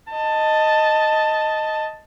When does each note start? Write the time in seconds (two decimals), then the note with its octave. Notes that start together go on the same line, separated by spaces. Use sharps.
0.12 D#5 A5